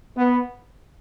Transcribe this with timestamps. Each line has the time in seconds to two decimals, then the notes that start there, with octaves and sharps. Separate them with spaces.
0.17 B3